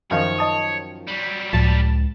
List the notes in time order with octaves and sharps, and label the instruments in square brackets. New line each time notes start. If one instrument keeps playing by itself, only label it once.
[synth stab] F#2 D#3 F3 [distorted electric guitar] C#5
[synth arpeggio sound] D#5 A5 D#6
[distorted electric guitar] F#3 G3
[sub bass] C#2 [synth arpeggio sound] A2 F3 [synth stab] A5